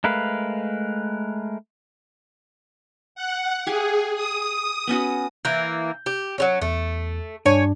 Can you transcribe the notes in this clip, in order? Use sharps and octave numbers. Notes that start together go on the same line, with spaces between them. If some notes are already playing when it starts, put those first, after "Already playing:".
G#3 A3 A#4 B4 F5
F#5
G4 G#4 F5 G#5
D#6
B3 C#4 F#4
E3 A#3 G6
G4
F#3 G3 C#4
E2 A3
G2 D4 C#5 G#5